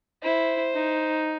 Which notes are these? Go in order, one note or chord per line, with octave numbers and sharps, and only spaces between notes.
E4 C5
D#4